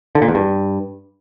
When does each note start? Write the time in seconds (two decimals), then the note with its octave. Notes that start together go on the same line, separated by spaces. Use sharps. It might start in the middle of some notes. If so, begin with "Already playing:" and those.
0.15 D3
0.22 A#2
0.28 E2
0.35 G2